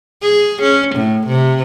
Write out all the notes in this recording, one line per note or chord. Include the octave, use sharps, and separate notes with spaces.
G#4
C#4
A2
C3